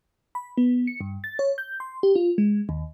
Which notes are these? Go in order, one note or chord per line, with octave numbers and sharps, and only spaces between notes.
B5
B3
C#7
G2
A6
C#5
G6
C6
G4
F4
G#3
D#2